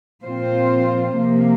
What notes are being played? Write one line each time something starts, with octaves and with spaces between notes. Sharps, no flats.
A#2 F3 C4 F4 C5
C3 F3 A#3